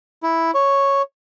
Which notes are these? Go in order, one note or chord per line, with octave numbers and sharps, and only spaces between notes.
E4
C#5